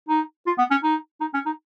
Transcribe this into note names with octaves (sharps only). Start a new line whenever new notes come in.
D#4
F4
B3
C#4
D#4
D#4
C#4
D#4